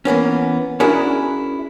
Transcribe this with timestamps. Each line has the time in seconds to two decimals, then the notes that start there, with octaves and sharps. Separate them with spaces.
0.05 E3 A#3 B3 C#4
0.80 C#4 D4 E4 F#4 G#4 A#4